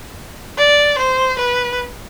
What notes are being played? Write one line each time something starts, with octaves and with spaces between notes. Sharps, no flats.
D5
C5
B4